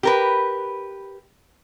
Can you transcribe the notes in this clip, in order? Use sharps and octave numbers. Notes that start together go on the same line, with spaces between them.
G4 A#4 B4